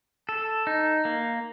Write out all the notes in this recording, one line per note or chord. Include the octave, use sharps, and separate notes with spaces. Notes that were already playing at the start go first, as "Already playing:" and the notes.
A4
D#4
A#3